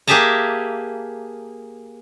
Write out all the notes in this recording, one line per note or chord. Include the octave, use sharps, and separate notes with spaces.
A#3 G4 G#4 E5 A5 A#5